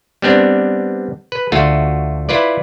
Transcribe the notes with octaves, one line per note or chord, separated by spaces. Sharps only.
G3 B3 C4 D4
B4
D2 A3 F4 F#4
E4 F4 B4 D5